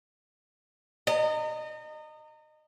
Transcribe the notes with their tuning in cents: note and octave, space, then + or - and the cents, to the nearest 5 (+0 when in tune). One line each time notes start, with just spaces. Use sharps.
D#5 -20 A#5 -35